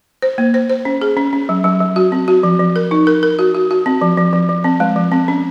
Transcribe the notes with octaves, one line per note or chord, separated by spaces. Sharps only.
C5
A#3
C5
C5
C#4
G#4
C#4
C#4
F#3
F#3
F#3
F#4
C4
F#4
F3
F3
A#4
D#4
A#4
A#4
F#4
F#4
F#4
C4
F3
F3
F3
F3
C4
G#3
F3
C4
C#4